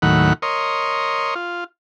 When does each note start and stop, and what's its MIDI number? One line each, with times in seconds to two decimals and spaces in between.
0.02 0.33 39
0.02 0.33 45
0.02 0.33 51
0.02 0.33 54
0.02 0.33 78
0.02 0.33 83
0.42 1.34 70
0.42 1.34 73
0.42 1.34 75
0.42 1.34 84
1.35 1.64 65